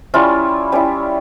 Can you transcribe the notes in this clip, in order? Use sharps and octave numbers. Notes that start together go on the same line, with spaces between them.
G3 C#4 E4 F4
G3 C#4 E4